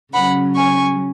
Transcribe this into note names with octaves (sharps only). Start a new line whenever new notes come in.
C#3 F#3 C#4 F#5 B5
G#5 C#6